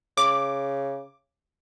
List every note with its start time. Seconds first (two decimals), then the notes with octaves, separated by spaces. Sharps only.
0.17 C#3 D6